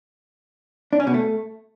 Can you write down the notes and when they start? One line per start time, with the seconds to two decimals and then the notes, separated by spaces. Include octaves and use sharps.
0.93 D4
1.00 C#4
1.07 B2
1.14 A3